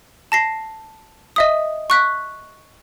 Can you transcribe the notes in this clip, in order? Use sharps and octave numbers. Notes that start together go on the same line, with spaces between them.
A5 A#6 C7
D#5 E5 D#6
C#6 F#6 B6